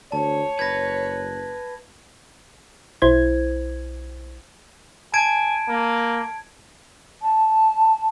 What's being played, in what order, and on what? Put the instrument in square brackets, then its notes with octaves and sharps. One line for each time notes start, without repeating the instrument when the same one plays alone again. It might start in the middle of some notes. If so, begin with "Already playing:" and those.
[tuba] D2 [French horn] C#5 [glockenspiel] A5
[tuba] F#1 [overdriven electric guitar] B4 [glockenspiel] G#6 A#6
[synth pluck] B1 E4 C5 G#6
[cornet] G#5 [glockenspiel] A5 G#6 D7
[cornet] A#3
[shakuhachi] A5